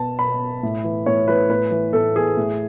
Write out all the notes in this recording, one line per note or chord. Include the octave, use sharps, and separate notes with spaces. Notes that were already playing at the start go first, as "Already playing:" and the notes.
Already playing: B2 A5
B2 B5
A2
E3
A2 C#5
E3 B4
A2 B4
E3
A2 A4
E3 G#4
A2